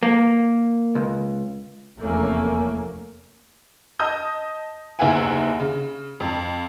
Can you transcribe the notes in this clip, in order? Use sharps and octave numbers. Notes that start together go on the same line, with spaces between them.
A#3
C#2
F1 E2 A3 A#3 C#4
D#5 A5 D#6 G6
F#1 D#2 B3 E5 F#5 G#5
C#3
F2 A5